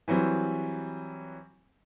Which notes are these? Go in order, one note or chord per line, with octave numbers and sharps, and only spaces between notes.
E3 F#3 G3 C4